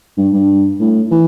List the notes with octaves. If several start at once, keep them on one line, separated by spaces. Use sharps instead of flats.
G2
G2
A2
E3